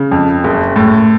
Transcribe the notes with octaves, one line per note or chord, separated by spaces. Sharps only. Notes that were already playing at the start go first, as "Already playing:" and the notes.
Already playing: C#3
F2
F#1
A2